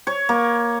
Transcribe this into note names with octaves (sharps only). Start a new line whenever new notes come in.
C#5
A#3